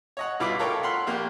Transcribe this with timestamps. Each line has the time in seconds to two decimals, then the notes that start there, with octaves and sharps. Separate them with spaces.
0.17 C#5 D#5 F#5
0.40 G2 B2 E4 F4 B5 D6
0.59 F4 A4 A#4 C#5 G5
0.83 F5 F#5 B5 C6 F6
1.07 A#1 A#3 G4